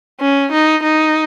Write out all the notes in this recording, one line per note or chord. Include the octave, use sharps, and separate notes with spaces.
C#4
D#4
D#4